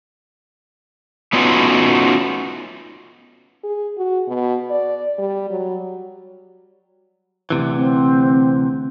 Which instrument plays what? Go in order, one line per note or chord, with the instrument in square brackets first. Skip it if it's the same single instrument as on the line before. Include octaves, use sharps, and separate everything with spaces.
[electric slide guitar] A3 B3 C#4 D#4 F4 F#4
[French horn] G#4
F#4
B2
D5
G3
F#3
[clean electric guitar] D2 C3 E3
[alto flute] C4